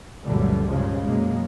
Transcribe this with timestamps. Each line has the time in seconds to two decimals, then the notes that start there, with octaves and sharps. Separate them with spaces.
0.25 C#2 F#2 A#2 D3 E3 G3
0.67 G2 A#2 C#3 F3 G#3
1.04 F#2 B2 G#3 A#3